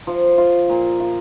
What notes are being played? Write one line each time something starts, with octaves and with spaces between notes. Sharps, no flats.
F3
F4
A#2
F4